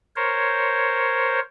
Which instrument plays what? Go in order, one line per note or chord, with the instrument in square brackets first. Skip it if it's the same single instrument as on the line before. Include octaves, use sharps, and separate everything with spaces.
[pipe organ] A#4 C5 C#5